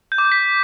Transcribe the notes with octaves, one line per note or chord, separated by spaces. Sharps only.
G6
D6
G6
B6